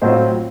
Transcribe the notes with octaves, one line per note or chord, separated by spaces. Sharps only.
A2 F#3 C4 F4 C5 D#5